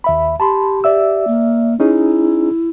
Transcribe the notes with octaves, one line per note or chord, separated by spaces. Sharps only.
D#2 E5 B5
G4 A5 B5 C6
D5 E5 E6
A#3
C#4 D#4 E4 G#4